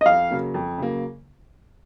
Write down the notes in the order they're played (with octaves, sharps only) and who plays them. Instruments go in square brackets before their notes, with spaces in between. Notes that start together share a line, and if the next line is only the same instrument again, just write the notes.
[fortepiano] D#5
[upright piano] F2 [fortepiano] F5
[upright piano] C#3 F#3 A#3
F2
C#3 F#3 A#3